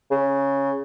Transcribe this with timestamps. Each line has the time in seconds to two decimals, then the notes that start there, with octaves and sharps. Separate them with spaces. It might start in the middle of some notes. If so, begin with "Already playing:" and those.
0.11 C#3